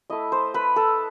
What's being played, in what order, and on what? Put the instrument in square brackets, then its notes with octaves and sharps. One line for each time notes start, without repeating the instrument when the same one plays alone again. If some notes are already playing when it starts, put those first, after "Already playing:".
[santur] A3 E4 D#5
C5
B4
A4